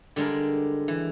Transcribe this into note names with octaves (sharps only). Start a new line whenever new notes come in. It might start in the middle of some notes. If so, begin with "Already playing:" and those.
D3 G3 G#3 D4 A#4
E3